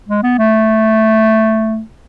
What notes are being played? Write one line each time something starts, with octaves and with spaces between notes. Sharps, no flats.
G#3
B3
A3